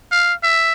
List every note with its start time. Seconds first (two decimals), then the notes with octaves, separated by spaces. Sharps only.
0.12 F5
0.43 E5